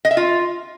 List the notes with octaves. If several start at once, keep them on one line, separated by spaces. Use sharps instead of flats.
D#5
E5
F4